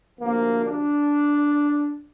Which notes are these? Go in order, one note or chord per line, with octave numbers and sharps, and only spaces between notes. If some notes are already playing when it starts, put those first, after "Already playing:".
D2 C3 F3 A#3
D4